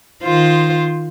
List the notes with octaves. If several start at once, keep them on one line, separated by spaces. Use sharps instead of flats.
D#3 F4 C5